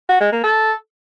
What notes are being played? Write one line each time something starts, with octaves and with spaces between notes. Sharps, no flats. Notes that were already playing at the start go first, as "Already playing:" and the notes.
F#4
G#3
A#3
A4